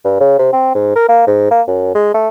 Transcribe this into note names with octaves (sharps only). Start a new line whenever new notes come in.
G2
C#3
C3
C4
G#2
A#4
A#3
G#2
A#3
F#2
G#3
A3